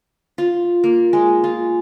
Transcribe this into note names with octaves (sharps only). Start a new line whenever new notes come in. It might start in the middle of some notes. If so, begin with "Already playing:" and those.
F4
A#3
G#3
F4